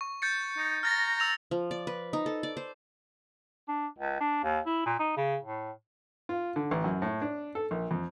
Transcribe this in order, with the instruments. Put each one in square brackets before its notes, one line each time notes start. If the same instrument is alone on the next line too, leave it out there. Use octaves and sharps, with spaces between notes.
[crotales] C#6
G6 A6 C#7
[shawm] D#4
[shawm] A#5 [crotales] F6 A6 A#6
[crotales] E6 F7
[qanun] F3
D5
B4
D#4
A4
D5
C5
[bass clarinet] D4
C#2
D4
D#2
E4
A#2
D#4
C#3
A2
[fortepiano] F4
D3
A1
F#2
A2
D4
A4
A#1
F2